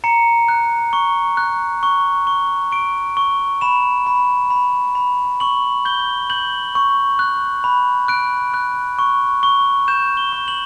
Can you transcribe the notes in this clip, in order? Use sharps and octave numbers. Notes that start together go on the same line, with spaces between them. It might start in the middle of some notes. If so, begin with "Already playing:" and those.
A#5 C#7
F#6
C#6
F#6
C#6
C#6
C#6 D7
C#6
B5 E7
B5
B5
B5
C#6 F#7
G6 G7
G6 F#7
C#6
F#6
B5
F#6 D7
F#6
C#6
C#6
G6 E7
G7
C#6
F#7